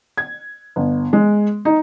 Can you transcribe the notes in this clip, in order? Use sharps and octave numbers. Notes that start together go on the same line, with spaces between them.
G#6
G1
G#3
D#4